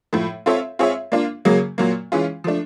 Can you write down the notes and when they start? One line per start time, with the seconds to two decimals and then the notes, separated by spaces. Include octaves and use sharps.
0.13 A2 F3 A3
0.46 C4 F4 A4 C#5 E5
0.79 C4 F4 G#4 C#5 E5
1.12 A#3 D4 F4
1.45 C#3 F#3 A#3
1.78 A#2 F#3 A#3
2.12 E3 G#3 C#4 F4
2.44 F3 A3 D4